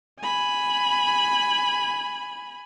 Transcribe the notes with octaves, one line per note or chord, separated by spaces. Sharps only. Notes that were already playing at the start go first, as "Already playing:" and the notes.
G#5 B5